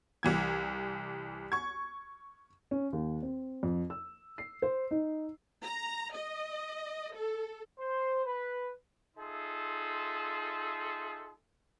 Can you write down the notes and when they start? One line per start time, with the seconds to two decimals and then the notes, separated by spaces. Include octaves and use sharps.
0.23 C2 E3 G#6
1.52 C#6 G#6
2.71 C#4
2.93 D#2
3.22 C4
3.63 F2
3.90 E6
4.38 C7
4.62 C5
4.91 D#4
5.63 A#5
6.13 D#5
7.14 A4
7.79 C5
8.25 B4
9.17 D#4 F4 G#4 A4 E5 C6